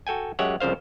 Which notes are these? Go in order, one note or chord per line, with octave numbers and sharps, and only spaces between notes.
F#4 A4 G5 G#5
F#2 G#3 G4 C#5 E5 F#5
C2 F2 C#3 C5 F5